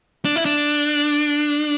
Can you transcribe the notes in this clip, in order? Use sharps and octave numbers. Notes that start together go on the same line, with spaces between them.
D4
E4
D4